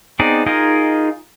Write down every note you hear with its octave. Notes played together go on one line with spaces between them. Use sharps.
B3 C4 D#4 G#4 D5
D#4 F4 G#4 A#4 D#5